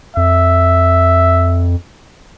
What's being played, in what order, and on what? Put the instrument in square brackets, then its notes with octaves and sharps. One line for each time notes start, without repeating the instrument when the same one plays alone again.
[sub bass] F2 [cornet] E5